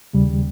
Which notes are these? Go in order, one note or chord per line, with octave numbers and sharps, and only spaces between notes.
D#2 C#3 G3